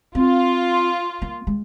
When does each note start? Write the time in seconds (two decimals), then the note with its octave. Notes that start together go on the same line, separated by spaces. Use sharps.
0.15 C4 F4
1.22 A#3
1.47 G#3